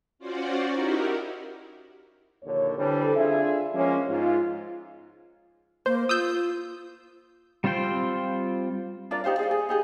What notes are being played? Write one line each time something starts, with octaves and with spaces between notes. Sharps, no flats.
C#4 F4 F#4 C5 D5 F#5
D#4 E4 F#4 G4 A#4
A#1 D#2 D3 C#5
D3 E3 G3 C4 D4 A4
D4 F4 G#4 E5
F3 G#3 A#3 C#4
G#2 F4
A#3 C5
F4 D#6 E6 G6
G3 C4 F4 C5 G5
D4 F4 A#4 D5
D#4 G4 C5 F5
G#4 D5 F5
G#4
D#4 G4 G#4